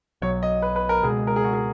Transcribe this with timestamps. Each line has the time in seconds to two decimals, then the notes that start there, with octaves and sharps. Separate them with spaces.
0.22 B1 B2 F#3 C#5
0.43 D#5
0.62 B4
0.76 B4
0.89 A#4
1.03 C#2 B2 G#3 G#4
1.27 A#4
1.36 G#4
1.44 F#4
1.54 G#4